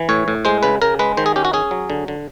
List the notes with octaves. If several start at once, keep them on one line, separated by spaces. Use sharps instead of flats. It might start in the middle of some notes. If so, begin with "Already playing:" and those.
Already playing: E3
A2 C#5
A2
G#3 C5
C#3 B4
C#3 A#4
G#3 B4
D#3 C5
G#4
C#4 G4
F#4
C#4 G#4
F#3
D3
D3